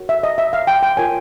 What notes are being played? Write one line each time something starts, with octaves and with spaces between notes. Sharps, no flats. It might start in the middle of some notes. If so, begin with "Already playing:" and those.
Already playing: F#4 A#4 C#5
E5
D#5
E5
F5
G5
G5
F4 A#4 C#5 G#5